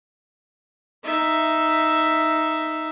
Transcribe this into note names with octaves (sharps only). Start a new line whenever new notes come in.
D#4 E5